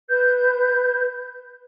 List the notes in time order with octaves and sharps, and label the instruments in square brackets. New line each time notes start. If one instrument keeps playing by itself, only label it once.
[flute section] B4 G6